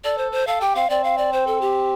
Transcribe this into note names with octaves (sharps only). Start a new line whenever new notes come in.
A4 D5
C5
C5
A4 F5
G4 G5
C4 F5
C4 D5
F5
D5
C5
A4
G4